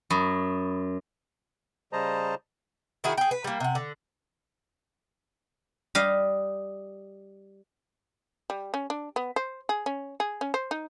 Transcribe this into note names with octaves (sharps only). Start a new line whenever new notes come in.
F#2 B5 C#6 D#6
C#3 G3 C5 D#5 A5 A#5
D#3 E4 F#4 G#4
G#4 G5
B4
G3 A#3
C3 F#5
D3
G3 D#5 F5
G3
C#4
D4
B3
C5
G#4
C#4
G#4
C#4
C5
D#4